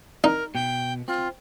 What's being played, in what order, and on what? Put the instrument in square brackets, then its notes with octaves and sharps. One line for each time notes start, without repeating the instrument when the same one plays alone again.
[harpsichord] D#4 [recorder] A#4
[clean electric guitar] B2 [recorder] G5
[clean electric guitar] C4 [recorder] F4